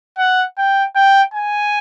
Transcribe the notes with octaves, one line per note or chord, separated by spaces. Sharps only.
F#5
G5
G5
G#5